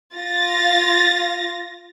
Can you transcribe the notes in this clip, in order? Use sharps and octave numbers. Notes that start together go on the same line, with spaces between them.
F4 A6 A#6